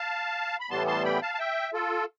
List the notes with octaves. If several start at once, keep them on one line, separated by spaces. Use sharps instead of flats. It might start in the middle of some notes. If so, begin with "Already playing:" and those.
Already playing: F5 A5
B5
A2 E3 G3 B3 A5 C6
A5 C6
G5 B5
F5 A5
A5
E5 G5
F4 A4